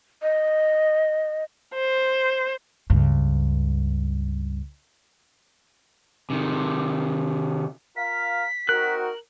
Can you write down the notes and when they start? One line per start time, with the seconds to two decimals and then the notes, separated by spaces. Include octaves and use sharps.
0.22 D#5
1.74 C5
2.90 C#2 G2
6.30 C3 D#3
7.96 F4 A#4 F5 B6
8.69 C4 D#4 F#4 A#4 F#6